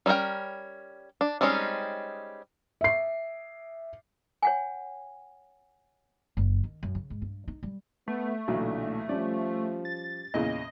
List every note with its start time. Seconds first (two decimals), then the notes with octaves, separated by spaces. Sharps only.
0.06 G3 C4 C#4 A#4 G5
1.21 D4
1.41 G3 G#3 C4 C#4 D#4
2.81 E5 C7
4.42 C#5 F#5 G#5
6.37 F#1
6.64 D#3
6.83 F#2
6.95 C#3
7.10 G#2
7.22 G2
7.48 D#4
7.63 G3
8.08 A3 B3
8.48 B1 A#2 D3 E3 F#3
9.09 F3 G3 C#4 D5
9.85 A6
10.34 E2 A#2 C#3 D#5